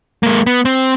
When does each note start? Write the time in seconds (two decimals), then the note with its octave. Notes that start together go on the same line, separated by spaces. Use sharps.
0.23 G#3 A#3
0.46 B3
0.65 C4